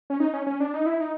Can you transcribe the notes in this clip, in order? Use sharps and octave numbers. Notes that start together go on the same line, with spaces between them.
C#4
D#4
C#4
C#4
D4
D#4
E4
D#4